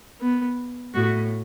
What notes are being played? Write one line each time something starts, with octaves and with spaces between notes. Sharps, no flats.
B3
A2 F#4